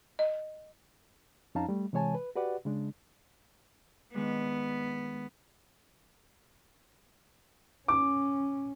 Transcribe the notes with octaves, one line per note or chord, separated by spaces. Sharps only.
D#5
F2 C#4 D#4 F5 A5 A#5
G3 A3
C3 E3 G#3 C#5 G#5 A5
B4
F#4 G4 B4 D5 F#5
C#3 G#3 D4
D#3 G#3 B3 D4
C#4 D6